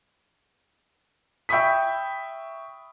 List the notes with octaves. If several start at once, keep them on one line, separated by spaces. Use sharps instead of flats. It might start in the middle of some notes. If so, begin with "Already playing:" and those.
E5 G5 B5 C#6 D#6 B6